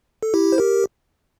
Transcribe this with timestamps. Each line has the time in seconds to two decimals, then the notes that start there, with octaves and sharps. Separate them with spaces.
0.23 A4
0.34 E4 G4
0.52 C5
0.58 G4 A#4